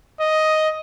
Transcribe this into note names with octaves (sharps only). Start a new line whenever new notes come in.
D#5